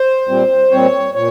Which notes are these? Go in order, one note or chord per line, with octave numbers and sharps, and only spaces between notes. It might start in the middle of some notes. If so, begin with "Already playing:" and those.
Already playing: C5
A#2 G3 C4
A#2 G3 C4 C#5
A#2 C#5